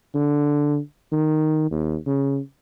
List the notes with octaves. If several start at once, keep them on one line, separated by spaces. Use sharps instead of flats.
D3
D#3
D#2
C#3